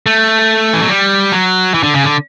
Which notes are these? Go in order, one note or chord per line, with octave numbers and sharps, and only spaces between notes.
A3
E3
F#3
G3
F#3
E3
D3
C#3
D3